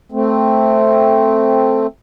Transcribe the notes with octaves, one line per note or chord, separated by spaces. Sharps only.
A3 C4